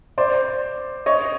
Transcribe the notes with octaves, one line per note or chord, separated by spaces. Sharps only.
C5 D5
C#5 D#5